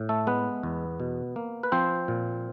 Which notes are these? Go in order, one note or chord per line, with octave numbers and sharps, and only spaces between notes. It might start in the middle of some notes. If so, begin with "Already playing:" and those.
Already playing: A2
A3 A4
G#3 B3 B4
E2
B2
A#3
B4
F3 C4 C5
A#2